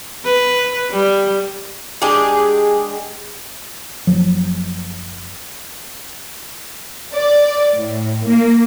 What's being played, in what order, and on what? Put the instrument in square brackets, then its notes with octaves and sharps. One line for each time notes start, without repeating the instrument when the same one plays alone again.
[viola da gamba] B4
G3
[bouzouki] G#3 D4 G4 G#4
[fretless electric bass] F#1 F3 F#3
[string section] D5
A2
A#3